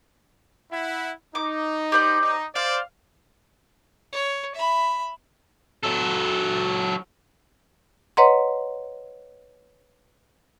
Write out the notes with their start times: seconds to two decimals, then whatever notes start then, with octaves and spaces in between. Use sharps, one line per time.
0.72 E4 F#5
1.35 D#4 D6
1.92 G4 C5 D5
2.21 D#4
2.55 C5 D5 F5
4.13 C#5
4.55 E5 B5
5.83 F#3 A4
8.17 B4 C#5 D#5 F#5 A#5 C6